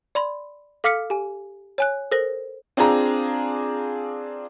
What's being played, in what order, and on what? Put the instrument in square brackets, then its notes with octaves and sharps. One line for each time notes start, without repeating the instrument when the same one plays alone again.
[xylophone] D5 B5 C6
A4 F5 D6 F6 B6 C#7
G4 G#5
C#5 G#5 F#6
A4 A#4 C5 A#6
[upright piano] C4 D4 F4 G#4 A#5